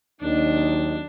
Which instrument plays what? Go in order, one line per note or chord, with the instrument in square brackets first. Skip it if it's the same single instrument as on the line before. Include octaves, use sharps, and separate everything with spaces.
[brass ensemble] D#2 F#3 D#4 [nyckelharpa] D4